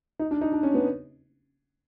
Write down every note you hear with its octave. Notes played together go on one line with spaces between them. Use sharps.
D#4
D4
D#4
D4
C#4
B3